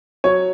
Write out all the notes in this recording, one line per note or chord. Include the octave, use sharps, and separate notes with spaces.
F#3 C#5